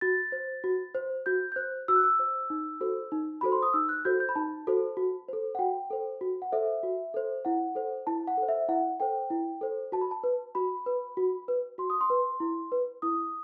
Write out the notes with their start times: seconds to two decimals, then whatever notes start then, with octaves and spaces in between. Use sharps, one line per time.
0.01 F#4 A6
0.32 C5
0.64 F#4
0.94 C5
1.26 F#4 G6
1.52 G6
1.56 C5 F#6
1.88 F#4 E6
1.96 F#6
2.04 E6
2.19 C5
2.50 D#4
2.81 F#4 A4 C5
3.12 D#4
3.41 F#4 A4 C5 B5
3.52 C6
3.62 D#6
3.73 D#4 E6
3.89 F#6
4.05 F#4 A4 C5 G6
4.20 G6
4.29 B5
4.36 D#4 A5
4.67 F#4 A4 C5
4.97 F#4
5.29 A4 C5
5.55 F#5
5.59 F#4 G5
5.90 A4 C5
6.21 F#4
6.42 F#5
6.52 A4 C5 E5
6.83 F#4
7.14 A4 C5
7.45 E4 F#5
7.75 A4 C5
8.07 E4 A5
8.27 F#5
8.37 A4 C5
8.48 E5
8.68 E4 F#5
9.00 A4 C5 G5
9.30 E4
9.61 A4 C5
9.92 F#4 A5
10.01 B5
10.11 A5
10.23 B4
10.55 F#4 B5
10.86 B4
11.17 F#4
11.48 B4
11.78 F#4 C6
11.90 D#6
12.01 C6
12.10 B4
12.40 E4
12.72 B4
13.02 E4 D#6